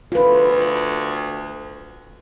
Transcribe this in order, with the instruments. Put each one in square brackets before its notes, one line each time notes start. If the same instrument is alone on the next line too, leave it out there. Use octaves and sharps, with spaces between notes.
[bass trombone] D2 [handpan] F4 B4